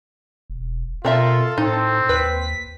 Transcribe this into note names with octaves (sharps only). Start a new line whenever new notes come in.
E1
B2 C4 F4 A4 A#4 E5
A2 C4 D#4
D#2 B4 B6